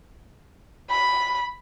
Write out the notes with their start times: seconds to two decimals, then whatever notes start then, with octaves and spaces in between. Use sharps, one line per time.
0.90 B5